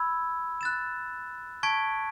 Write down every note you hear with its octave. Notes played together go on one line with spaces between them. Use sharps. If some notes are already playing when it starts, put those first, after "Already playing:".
Already playing: B5 E6 G#6
F#6 A6 E7
A5 C#6 G#6 B6 D7